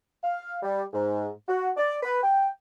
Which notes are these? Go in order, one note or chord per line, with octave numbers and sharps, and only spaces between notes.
F5
G3
G#2
F#4
D5
B4
G5